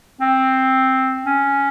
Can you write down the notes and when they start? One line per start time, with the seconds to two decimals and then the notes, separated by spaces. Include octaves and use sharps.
0.21 C4
1.25 C#4